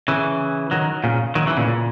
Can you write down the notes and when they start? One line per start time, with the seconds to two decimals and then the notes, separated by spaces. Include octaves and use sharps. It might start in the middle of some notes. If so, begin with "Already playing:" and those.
0.08 C#3 E3
0.71 D#3 F#3
1.04 A#2 C#3
1.35 D#3 F#3
1.46 C#3 E3
1.57 A#2 C#3
1.67 A#2